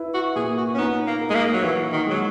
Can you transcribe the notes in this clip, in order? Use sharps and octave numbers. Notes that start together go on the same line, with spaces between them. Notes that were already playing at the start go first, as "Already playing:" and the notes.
Already playing: E4 B4
F#4
A#2 G#4
F#4
C#4
B3 D#4
A#3
A#4
G#3
A#3
F#3
E3 F#4
D#3
F#3 G#3